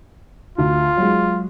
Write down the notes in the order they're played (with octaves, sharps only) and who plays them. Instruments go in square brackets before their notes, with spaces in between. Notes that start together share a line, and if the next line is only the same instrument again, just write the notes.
[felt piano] D2 [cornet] F4
[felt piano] F#3 G#3